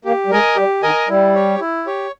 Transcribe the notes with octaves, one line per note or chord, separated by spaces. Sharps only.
A#3 G4
G3
G#3 A#4 D#5 G#5
G3 G4
D#3 A#4 D#5 G#5
G3 E4
G4 C#5
E4
G4 C#5